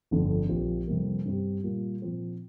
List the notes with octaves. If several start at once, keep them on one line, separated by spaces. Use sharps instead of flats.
G1 F2 D3
A#1 A#2 F3 C4 G4
F2 C3 G3 A#3
G2 G3 C4 G4
A#2 G3 A#3 F4
A#2 F3 C4